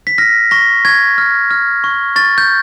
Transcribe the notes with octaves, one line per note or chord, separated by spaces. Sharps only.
B6
F6 A#6
C#6 A#6
C#6 G#6
F6
F6
C#6
C#6 A6
G6